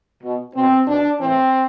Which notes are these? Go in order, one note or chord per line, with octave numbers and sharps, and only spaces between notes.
B2
B2 C4
B2 D4
A2 E3 C4